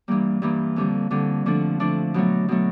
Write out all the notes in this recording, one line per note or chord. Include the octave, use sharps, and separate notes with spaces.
G2 E3 G3 A#3
G2 E3 G3 A#3
F2 D3 G3
F2 D3 G3
D3 F3 A3 D4
D3 F3 A3 D4
B2 F#3 A3
B2 F#3 A3